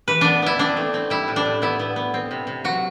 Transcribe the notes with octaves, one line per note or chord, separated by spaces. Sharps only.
E3 B4
B3 D4
B3 E4
C4 D4
A3
C4
G3 E4
A2
D4
A2
B3 E4
B3
B3
C4
C3
C3
F#3 F#4